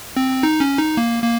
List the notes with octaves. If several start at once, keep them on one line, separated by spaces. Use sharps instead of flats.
C4
D#4
C#4
D#4
A#3
A#3